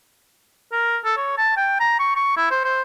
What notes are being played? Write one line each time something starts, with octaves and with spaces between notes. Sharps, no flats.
A#4
A4
C#5
A5
G5
A#5
C#6
C#6
E4
C5
C5